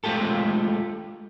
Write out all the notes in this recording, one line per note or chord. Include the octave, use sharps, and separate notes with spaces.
G#3 A3 F4 G4 A4